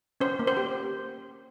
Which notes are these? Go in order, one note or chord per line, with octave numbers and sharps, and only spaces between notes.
C#4 C5
A#3
C5
G4